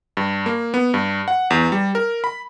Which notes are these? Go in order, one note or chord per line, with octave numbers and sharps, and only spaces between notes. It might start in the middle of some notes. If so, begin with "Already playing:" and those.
G2
A#3
B3
G2
F#5
E2
G3
A#4
B5